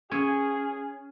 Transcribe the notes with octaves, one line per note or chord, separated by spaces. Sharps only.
C#4 G#4